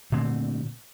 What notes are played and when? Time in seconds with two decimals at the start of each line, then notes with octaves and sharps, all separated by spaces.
0.12 A#2 D3 A3 C4